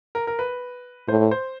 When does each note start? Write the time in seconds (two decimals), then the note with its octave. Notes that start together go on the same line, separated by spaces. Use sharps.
0.15 A#4
0.27 A#4
0.39 B4
1.08 A2 C5
1.31 C5